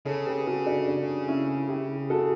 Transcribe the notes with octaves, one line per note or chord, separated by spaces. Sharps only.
C#3 A4 C#5
G4 B4
F#4 A4
D4 F#4
D4
C#4 E4
E4 G4
F#4 A4